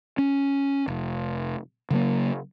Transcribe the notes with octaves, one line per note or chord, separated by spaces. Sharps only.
C#4
F1
C#3 F#3 A#3